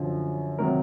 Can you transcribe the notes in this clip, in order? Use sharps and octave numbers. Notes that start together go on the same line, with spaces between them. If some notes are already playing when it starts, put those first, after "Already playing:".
Already playing: F#2 D3 F3
C3 D#3 F#3 A#4